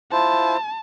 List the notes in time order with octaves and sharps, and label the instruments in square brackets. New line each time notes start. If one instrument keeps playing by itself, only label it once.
[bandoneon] E4 F4 C5 [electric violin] A5